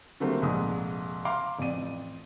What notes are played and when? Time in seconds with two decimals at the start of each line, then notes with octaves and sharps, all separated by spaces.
0.20 D3 F#3 G3 A3 A#3 C4
0.42 F1 A#1 G#2 D#6
1.25 F5 A#5 C6 D6
1.59 A1 F2 D5 D#7